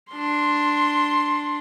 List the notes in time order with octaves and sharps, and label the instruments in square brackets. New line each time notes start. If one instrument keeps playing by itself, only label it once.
[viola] D4 C6